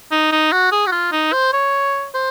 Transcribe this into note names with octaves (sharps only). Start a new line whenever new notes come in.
D#4
D#4
F#4
G#4
F#4
F4
D#4
C5
C#5
C5